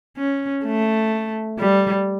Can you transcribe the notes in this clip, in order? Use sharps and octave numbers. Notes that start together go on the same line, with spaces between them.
C#4
A3
G3